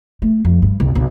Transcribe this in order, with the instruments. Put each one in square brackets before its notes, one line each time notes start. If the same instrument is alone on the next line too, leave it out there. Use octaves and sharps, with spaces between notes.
[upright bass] A3
F2
G2
C2
B1